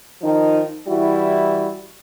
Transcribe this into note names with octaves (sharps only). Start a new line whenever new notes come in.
D#3 F3 D#4
E3 G3 E4 F#4